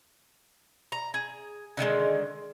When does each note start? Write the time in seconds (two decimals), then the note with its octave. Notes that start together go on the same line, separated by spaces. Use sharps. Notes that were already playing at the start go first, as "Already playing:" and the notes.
0.92 A#5
1.14 G#4
1.77 D3 D#3 F3 G#3